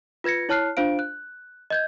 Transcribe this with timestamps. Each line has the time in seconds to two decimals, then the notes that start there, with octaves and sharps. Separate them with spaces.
0.24 F4 B4 G#6 A#6 C#7
0.49 E4 C#5 A5 F6 F#6 C7
0.77 D4 F4 C5 F5 D7
0.99 F#6
1.70 D#5 G6 G#6